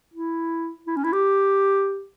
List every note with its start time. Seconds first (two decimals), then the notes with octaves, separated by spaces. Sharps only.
0.14 E4
0.87 E4
0.96 C#4
1.04 E4
1.12 G4